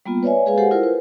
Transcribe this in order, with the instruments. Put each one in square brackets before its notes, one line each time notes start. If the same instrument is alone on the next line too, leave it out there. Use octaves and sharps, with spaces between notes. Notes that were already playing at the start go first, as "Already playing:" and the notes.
[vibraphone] G3 A#3 B3 F4
B4 C#5 D5 E5 G#5
G#3 G#4 B4 F5 G#5
G4 A4 C5 F#5
E4 F4 A#4 C5
B4